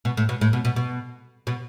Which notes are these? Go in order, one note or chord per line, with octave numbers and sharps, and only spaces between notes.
B2
A2
B2
A2
B2
B2
B2
B2